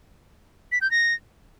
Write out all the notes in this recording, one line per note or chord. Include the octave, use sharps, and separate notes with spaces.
B6
G6
A#6